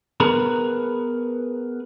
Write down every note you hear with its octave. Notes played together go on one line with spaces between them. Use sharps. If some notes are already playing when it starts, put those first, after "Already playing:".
B3 G#4 A#4 B4